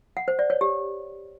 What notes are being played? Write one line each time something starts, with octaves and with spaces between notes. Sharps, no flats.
F#5
C5
D5
C#5
G4